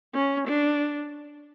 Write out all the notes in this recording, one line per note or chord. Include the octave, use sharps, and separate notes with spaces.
C#4
D4